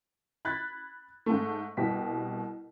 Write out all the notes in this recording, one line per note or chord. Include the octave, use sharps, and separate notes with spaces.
B5 F#6 G#6 A6 B6
G#2 A3
C2 B2 E4 G4 B6